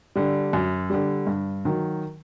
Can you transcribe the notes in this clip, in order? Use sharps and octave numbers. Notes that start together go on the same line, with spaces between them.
D3 G3
F#2
D3 G3
G2
D#3 F#3